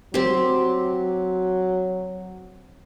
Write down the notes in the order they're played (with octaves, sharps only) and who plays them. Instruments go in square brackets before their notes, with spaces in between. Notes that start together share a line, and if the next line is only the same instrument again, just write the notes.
[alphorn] F#3 [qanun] C4 G4